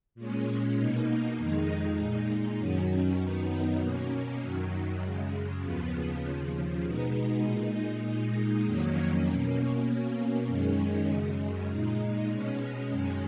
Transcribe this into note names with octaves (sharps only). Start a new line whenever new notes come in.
A#2 G#3 C#4
B2 A#3 D#4
F2 D#3 G#3 D#4
A#2 G#3 D#4
F#2 D#3 F#3 C#4
F#2 D#3 F#3 B3 D#4
B2 A#3 C#4
F#2 D#3 F#3
F#2 C#3 G#3
D#2 C#3 F3 B3
D#2 C#3 F3
B2 G#3 B3 D#4
A#2 G#3 D#4
A#2 G#3 D#4
F2 D#3 F#3 A#3 C#4
B2 A#3 C#4
B2 A#3 C#4
F#2 D#3 G#3 C#4
F#2 C#3 G#3
A#2 G#3 D#4
B2 G#3 C#4
F#2 D#3 G#3 C#4